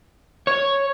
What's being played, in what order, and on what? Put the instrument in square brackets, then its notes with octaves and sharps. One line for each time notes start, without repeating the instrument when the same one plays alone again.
[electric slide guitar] C#5